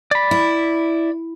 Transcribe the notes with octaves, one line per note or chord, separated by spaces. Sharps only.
D5 B5
E4